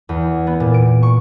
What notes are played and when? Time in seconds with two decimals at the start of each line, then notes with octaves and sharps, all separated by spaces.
0.09 E2
0.47 B3
0.60 A#2
0.74 D7
1.03 C#6